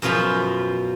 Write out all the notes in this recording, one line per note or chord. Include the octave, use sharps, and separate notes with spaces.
F#2 B2 F3 F4 B5